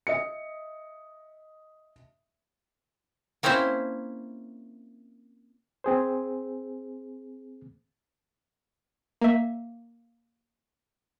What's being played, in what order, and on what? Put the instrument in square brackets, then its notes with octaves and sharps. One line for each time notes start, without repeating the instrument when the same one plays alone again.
[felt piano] D#5 E5 C#7
[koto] A#3 C4 C#4 E4 C5 E5
[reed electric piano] C4 G#4 C5
[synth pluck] A#3 E5